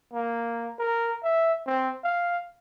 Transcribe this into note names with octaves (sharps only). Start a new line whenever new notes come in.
A#3
A#4
E5
C4
F5